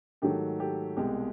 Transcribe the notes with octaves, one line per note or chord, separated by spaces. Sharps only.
G#2 D#3 F#3 A3 G4 A4
G4 A4
C2 B2 G#3 G4